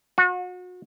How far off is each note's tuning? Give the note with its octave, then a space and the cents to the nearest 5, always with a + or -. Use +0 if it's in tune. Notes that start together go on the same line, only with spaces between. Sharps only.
F#4 -35